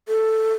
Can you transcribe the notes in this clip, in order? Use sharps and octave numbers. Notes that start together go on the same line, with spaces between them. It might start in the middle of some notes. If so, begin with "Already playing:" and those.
A4